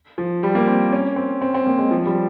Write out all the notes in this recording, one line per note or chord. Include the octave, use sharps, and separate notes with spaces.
F3
G3
A#3
C4
C#4
C4
C4
C4
A#3
G#3
F3
G3